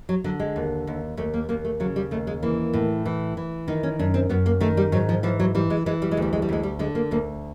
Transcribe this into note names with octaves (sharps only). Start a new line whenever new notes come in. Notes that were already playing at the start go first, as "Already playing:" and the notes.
F#3
D3 F#3
G#3
D#2
D#2
D#2 A3
A#3
D#2 A#3
A3
C#3 F#3
G3
D#2 A3
G#3
E3 A#3
A2
E3
E3
D#3 D#4
C#4
F#2 D4
C4
F#2 B3
A#3
D#3 A3
G3
G#2 F#3
F3
E3 F3
F#3
E3 G3
G#3
E3 G#3
G3
G#3
D2
G3
G#3
G3
D2 G#3
G3
D3 G#3
A#3
D2 A#3